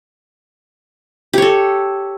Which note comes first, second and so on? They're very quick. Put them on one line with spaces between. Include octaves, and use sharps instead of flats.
G4 C#5 A4